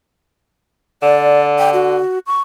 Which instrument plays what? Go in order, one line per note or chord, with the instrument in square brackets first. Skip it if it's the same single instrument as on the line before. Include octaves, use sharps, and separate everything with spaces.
[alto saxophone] D3 [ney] D5
[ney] G5
F#4
C#6